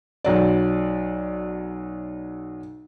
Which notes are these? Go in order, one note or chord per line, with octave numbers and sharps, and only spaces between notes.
B1 F#3 D5